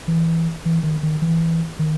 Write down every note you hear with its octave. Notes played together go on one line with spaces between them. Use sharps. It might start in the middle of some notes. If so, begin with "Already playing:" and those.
E3
E3
D#3
D#3
E3
D#3